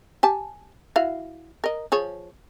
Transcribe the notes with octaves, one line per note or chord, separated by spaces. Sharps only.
G4 G#5 A5
E4 F#4 F5
A#4 D#5
F3 G#4 C#5